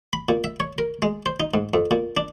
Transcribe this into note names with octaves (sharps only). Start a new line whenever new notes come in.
B5
A#2
E5
C#5
A#4
G#3
C5
D#4
G#2
F2
A#2
D4